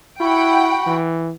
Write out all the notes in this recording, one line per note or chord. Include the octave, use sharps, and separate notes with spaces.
E4 F#4 F#5 G5 B5
E3